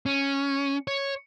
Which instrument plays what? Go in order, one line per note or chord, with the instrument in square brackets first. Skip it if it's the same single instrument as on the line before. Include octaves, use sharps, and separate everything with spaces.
[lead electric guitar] C#4
C#5